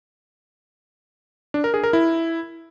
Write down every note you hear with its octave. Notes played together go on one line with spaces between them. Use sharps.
D4
A#4
G#4
A#4
E4